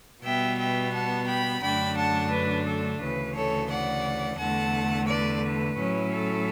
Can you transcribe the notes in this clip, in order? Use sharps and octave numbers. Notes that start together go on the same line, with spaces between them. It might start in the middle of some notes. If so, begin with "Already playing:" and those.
B2 G3 B3 E5 G5
E5 G5
F#5 A5
G5 B5
F#2 D3 A3 D4 G5 B5
F#5 A5
B4
A4
D2 C#3 E3 B4
A4 C#5
D5 F#5
E2 D3 A3 F#5 A5
B4 D5
B4
A2 F#3 C#4 E4
A4